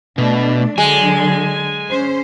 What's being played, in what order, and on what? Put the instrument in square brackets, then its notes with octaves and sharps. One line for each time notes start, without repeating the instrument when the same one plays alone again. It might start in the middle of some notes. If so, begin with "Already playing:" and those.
[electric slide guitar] B2 [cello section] A3 D4
[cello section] D3 F#3 [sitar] G#3 [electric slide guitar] G#5
[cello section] C#4 C5